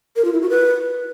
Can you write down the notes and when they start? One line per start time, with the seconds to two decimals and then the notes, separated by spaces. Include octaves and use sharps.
0.16 A#4
0.25 F4
0.33 E4
0.41 F#4
0.50 B4